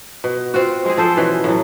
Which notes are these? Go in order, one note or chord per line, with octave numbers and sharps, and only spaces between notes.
B2
C4 F4 F#4
G#3 C4 G#4
F3 A4 C5
B2 E3 C#4
A2 F#3